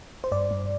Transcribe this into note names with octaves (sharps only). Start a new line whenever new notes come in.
C5
G2 D5
G2